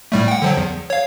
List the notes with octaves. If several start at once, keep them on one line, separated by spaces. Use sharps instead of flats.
A2 G3 A3
F#5 G5
D3 F3 F#3
E2
C#5 F5